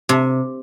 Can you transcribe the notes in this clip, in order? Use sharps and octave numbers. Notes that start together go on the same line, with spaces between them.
C3